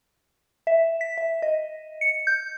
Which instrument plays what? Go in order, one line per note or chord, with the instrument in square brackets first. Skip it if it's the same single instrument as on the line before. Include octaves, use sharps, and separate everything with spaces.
[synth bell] E5
B6
E5
D#5
C#7
G6